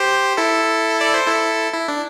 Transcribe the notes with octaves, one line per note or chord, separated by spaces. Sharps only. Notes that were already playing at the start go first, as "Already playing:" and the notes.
Already playing: G4 C5
E4 A4
D5
C5
E4 A4
E4
D4